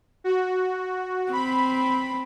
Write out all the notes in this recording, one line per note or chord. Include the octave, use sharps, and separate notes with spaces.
F#4
C4 B5